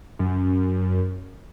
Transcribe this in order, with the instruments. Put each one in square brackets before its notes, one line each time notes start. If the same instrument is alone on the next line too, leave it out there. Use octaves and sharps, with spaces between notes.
[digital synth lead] F#2